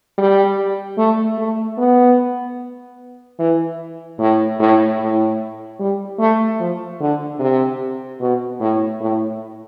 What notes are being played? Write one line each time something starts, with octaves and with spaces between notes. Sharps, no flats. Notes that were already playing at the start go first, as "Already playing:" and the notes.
G3
A3
A3
B3
E3
A2
A2
A2
G3
A3
F3
D3
C3
B2
A2
A2